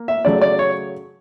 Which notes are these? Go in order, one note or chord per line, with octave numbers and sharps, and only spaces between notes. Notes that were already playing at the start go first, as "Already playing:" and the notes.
Already playing: A#3
E5
C#3 F#3 A3 D5
D5
C#5